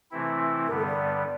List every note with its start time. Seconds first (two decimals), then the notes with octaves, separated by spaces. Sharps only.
0.11 C3 E3 A3 C4 E4
0.67 G2 D3 G3 B3 A#4
0.77 A4
0.87 D5